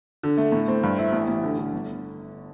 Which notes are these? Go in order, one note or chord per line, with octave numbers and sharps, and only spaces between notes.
D3
A3
A2
C4
G2
E4
A1
A1
D3
D3
G1